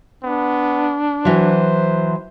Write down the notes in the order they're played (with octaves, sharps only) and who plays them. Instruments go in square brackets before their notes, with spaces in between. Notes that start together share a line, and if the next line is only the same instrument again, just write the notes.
[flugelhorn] B3 [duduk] D4
[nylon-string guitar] E3 F#3 [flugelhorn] C5